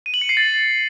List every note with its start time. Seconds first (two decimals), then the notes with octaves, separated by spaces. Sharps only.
0.06 D#7
0.14 F#7
0.21 C#7
0.29 C7
0.37 A6